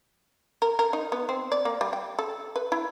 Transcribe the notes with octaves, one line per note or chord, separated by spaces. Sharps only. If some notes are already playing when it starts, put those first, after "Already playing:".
A#4
A#4
D#4
B3
C4
D5
A#3
G3
G5
A4
B4
E4